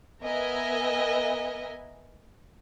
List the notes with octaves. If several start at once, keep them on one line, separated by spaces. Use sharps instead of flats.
B3 A#4 D#5 E5 G#5